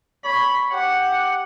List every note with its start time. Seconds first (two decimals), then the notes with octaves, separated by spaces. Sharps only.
0.25 C#5 B5
0.72 G4 F#5